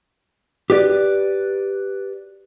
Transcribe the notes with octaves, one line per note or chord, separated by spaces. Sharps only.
G4 B4 D5